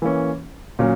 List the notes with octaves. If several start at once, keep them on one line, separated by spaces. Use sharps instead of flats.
E3 A#3 C#4
A#2 F#3 C#4